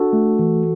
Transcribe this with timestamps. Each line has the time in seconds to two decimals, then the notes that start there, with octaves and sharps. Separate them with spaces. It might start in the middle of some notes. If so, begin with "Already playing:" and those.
Already playing: D4 F#4 A4
0.13 A3
0.39 E3